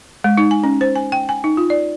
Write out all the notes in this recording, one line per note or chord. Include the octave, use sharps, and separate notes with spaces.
G#3
D#4
G#5
C#4
C5
G#5
G5
G#5
D#4
F4
D5